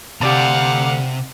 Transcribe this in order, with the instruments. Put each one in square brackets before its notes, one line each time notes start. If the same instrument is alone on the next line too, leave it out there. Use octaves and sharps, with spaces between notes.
[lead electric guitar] D2 [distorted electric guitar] C3 [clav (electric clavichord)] G4 D5 A5 [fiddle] F5 F#5